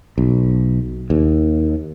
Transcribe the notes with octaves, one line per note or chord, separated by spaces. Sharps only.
B1
D#2